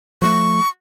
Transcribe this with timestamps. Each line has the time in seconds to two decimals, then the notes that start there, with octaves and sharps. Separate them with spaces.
0.22 F3 G3 A3 C#6